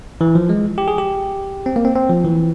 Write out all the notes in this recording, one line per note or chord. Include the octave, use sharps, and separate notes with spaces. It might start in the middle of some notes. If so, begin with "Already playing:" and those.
E3
F3
G#3
G4
G#4
G4
C4
A#3
C4
C4
F3
E3